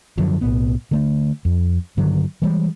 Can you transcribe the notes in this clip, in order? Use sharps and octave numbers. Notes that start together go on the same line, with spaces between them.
F#2 D3 F3 F#3
B1 A2 B3
D3 A3 D4
F2
G2 D3 D#3 F#3
E3 G3 G#3